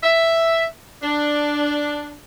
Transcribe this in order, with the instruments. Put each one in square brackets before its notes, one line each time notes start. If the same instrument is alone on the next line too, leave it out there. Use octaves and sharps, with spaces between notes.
[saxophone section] E5
D4